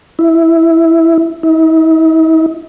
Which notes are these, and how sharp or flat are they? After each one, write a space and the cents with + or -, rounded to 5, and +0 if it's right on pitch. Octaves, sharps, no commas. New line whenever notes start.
E4 +0
E4 -45